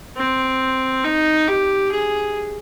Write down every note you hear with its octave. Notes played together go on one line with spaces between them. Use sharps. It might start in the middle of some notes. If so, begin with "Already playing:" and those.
C4
D#4
G4
G#4